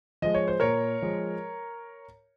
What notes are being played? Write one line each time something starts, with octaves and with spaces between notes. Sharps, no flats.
F3 G#3 D#5
C#5
C5
A#2 A#4 C#5
F3 G#3